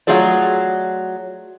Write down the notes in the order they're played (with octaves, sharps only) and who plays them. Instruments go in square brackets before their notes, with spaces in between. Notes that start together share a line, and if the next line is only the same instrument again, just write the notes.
[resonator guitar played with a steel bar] F#3 A3 F4 G#4 D5